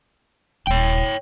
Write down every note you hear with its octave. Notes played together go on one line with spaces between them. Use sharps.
D#1 C#5 G5